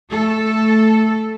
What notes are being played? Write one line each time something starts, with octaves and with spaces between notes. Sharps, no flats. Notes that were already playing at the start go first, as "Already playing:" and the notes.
A3 A4